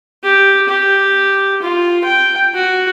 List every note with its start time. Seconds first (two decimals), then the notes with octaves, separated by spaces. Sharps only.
0.23 G4
0.69 G4
1.62 F4
2.04 G5
2.54 F#4